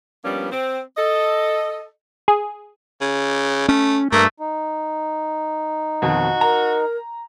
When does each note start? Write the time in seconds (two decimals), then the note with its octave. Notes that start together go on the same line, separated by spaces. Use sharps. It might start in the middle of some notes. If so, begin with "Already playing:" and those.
0.24 F3 G3 A#3 B3 C#4 D4
0.52 C4
0.97 A4 D#5
2.28 G#4
3.01 C#3
3.69 A3 C#4
4.12 G2 A3 A#3
4.40 D#4
6.02 F2 B2 D#3 F#4
6.41 A#4 A#5